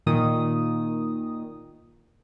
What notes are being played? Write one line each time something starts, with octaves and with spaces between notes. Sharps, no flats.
A#2 D#3 D#6